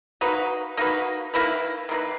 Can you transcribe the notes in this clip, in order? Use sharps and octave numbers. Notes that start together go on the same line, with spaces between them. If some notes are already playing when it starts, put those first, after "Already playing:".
A#3 D#4 F#4 B4
A#3 D#4 F#4 B4
D#3 A#3 E4 B4
D#3 A#3 E4 B4